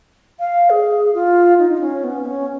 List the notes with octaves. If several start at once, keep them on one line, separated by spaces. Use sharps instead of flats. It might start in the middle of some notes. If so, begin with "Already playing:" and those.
F5
G#4
F4
D#4
D#4
C#4
B3
C#4